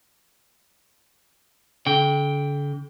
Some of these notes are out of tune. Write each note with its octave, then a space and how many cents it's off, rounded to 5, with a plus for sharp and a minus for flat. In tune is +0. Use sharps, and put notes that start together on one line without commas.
D3 -40 G5 +0